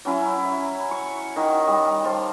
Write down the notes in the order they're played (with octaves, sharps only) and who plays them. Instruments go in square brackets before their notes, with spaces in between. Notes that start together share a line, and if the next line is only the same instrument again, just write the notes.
[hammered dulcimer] F#3 C#4 E4
E5
C#6
D#3 F#4
G3
C5 F5 A5